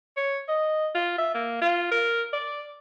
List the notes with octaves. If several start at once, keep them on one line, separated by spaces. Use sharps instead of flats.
C#5
D#5
F4
E5
A#3
F4
A#4
D5